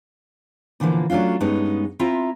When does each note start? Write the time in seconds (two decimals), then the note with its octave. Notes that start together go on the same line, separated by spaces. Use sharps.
0.80 A#2 D3 E3 F3 A#3
1.10 F#3 A3 C#4 D4 F4
1.40 G2 G#3 B3 C#4 D#4
1.99 C4 E4 F4 E5 A#5